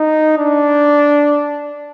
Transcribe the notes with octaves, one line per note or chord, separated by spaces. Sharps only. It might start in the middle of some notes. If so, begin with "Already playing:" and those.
Already playing: D#4
D4